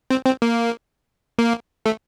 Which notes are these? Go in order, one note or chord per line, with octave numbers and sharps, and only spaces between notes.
C4
C4
A#3
A#3
A3